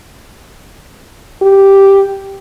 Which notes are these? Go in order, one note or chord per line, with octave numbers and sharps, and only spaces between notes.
G4